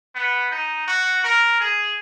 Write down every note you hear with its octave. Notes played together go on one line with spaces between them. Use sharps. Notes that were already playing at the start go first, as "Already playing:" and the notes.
B3
D#4
F#4
A#4
G#4